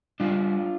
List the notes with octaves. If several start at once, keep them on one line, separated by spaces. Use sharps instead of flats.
G3 D4 F4